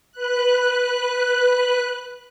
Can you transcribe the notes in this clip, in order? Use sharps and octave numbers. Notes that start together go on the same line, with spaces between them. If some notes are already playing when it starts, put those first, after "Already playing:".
B4 F#6